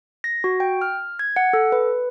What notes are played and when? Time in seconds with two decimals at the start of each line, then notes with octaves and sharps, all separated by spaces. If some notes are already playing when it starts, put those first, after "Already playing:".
0.24 A#6
0.44 F#4
0.60 G5
0.82 F6
1.19 G#6
1.36 F#5
1.53 A4
1.72 B4